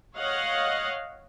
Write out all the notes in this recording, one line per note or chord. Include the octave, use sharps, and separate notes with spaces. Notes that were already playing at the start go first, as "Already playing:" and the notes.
C#5 D#5 F5 F#5